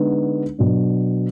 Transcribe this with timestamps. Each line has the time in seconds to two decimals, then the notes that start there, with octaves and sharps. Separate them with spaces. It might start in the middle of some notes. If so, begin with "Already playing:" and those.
Already playing: D3 G#3 B3 D#4
0.58 B2 F#3 D4